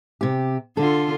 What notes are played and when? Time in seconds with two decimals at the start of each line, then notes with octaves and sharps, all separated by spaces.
0.21 C3 G4
0.77 D3 F4 A4